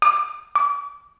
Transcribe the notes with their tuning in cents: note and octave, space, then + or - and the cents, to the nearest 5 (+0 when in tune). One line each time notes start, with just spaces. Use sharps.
D6 +20
D6 -45